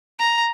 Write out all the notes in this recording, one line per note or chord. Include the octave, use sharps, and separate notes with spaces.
A#5